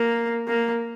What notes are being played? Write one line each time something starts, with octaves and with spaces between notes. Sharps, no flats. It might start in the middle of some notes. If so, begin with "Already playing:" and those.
Already playing: A#3
A#3